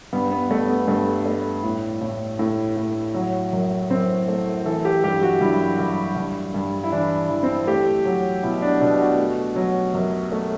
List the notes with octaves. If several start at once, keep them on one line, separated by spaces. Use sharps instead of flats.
G2 B3
B3
G2 A3
B3
G2 A3
A3
A2
A2
A2
A2
F#3
F#2
F#2 C4
A3
E3 A4
G4
G2 G4
F#4
G2 E4
G2
G2
G2
E4
E3 D4
E3
C4
A3 G4
F#3
B2 E4
D4
B2 D4
F#4
A3
F#3
F#2
A3